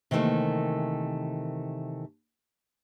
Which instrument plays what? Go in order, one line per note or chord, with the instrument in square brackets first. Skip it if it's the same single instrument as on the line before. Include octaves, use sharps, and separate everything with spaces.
[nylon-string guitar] C3 D#3 E3 F#3 A3 A#3